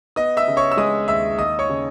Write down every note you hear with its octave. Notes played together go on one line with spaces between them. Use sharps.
B3 D#5 D#6
E5 E6
C#3
C#5 C#6
E6
G#3 D#5 D#6
D#2 E5 E6
D#2 D#5 D#6
C#5 C#6
C#3